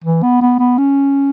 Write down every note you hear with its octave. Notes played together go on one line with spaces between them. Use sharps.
E3
B3
B3
B3
C#4